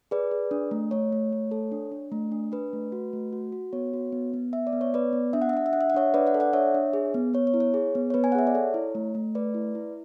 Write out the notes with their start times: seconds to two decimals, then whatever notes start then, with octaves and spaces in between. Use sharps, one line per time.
0.11 G#4 B4 D5
0.31 G#4
0.51 D4
0.71 A3
0.91 A3 C#5
1.12 A3
1.33 A3
1.51 A4
1.72 D4
1.92 D4
2.12 A3
2.32 D4
2.52 D4 B4
2.73 A3
2.92 F#4
3.13 A3
3.33 F#4
3.52 F#4
3.73 B3 C#5
3.93 F#4
4.12 B3
4.34 B3
4.53 B3 E5
4.67 D5
4.73 B3
4.81 C#5
4.94 B3 B4 D5
5.13 B3
5.33 D4 E5
5.42 F#5
5.49 E5
5.53 D4 F#5
5.66 E5
5.73 D4 F#5
5.81 E5
5.90 F#5
5.94 D4 C#5 E5
6.14 D4 B4 D5
6.27 D5 F#5
6.34 A4
6.40 D5 F#5
6.53 D4 C#5 E5
6.74 D4
6.93 G#4
7.14 B3
7.34 B3 C#5
7.47 C#5
7.54 E4
7.60 C#5
7.74 G#4
7.95 B3
8.10 C#5
8.14 B3 B4
8.24 G#5
8.32 F#5
8.35 G#4 E5
8.47 D5
8.55 A4 C#5
8.74 E4
8.95 A3
9.15 A3
9.35 A3 B4 D5
9.54 E4
9.75 E4